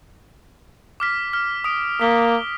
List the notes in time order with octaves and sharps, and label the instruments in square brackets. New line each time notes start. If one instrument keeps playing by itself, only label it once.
[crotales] D6 F6 B6
F6
D#6 D7
[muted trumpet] A#3 [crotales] B6 G7